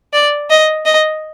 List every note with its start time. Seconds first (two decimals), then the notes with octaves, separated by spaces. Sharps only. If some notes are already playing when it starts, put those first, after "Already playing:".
0.14 D5
0.51 D#5
0.86 D#5